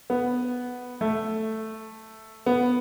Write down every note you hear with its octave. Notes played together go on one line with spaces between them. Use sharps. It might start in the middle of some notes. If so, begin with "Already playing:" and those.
B3
A3
B3